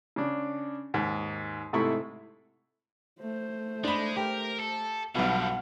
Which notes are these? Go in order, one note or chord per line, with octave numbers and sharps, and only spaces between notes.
C#3 D4
D#2 G#2
G#2 C3 A3 E4 B5 C#6
A3 C5
G#3 D4 B5
G4 A#4
A4
B1 G2 B2 D3 F3 F5 F#5